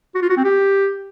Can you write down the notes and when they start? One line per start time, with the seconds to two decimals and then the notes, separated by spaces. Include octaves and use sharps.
0.15 F#4
0.22 F4
0.29 F#4
0.37 C4
0.44 G4